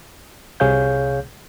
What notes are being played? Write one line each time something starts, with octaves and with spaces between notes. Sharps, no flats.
C2 C3 G#4 C#5 F5 G6